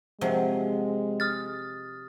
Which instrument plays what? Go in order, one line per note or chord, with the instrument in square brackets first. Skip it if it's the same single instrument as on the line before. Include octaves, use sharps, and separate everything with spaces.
[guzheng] C3 F3 F#3 [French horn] G#3
[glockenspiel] D#6 F6 A6